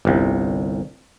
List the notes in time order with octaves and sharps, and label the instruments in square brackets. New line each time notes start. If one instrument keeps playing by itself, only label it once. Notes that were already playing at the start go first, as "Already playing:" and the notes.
[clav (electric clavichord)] G1 C2